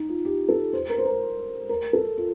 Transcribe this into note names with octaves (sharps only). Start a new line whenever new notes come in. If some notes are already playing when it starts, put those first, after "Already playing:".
Already playing: D#4
F4
G4
A4
C5
A#4
C5
A#4
A#4
A4
F4